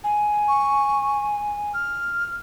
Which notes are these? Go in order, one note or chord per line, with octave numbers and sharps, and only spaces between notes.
G#5
C#6
F6